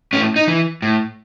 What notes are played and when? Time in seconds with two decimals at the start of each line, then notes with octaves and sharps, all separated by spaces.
0.13 A2 C#4
0.36 D#4
0.47 E3
0.82 A2